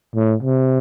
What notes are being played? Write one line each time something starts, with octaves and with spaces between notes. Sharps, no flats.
A2
C3